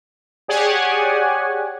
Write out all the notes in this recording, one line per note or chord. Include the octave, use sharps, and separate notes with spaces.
G4 G#4 C#5 D5 F#5 G#5